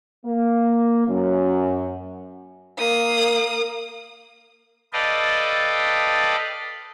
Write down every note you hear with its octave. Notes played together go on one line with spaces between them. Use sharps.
A#3
F#2
A#3 D#6
A4 B4 D5 D#5 F5 G5